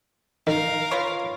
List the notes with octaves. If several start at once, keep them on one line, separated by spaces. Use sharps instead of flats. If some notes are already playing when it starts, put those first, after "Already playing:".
D#3 A#4 F5
F4 B4 C#5